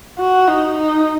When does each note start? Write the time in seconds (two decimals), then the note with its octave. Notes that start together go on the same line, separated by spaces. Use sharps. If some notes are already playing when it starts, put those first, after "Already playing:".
0.19 F#4
0.48 D#4
0.78 D#4